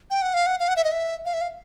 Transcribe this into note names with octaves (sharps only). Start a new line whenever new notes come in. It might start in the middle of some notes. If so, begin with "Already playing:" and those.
G5
F#5
F5
F#5
F5
F#5
E5
D#5
E5
F5
E5
F5